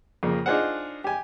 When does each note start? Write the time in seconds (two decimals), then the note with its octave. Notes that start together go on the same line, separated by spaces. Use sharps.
0.23 F2 C#3 A#3
0.46 D4 D#4 F4 G#4 C5 F#5
1.04 G4 G#5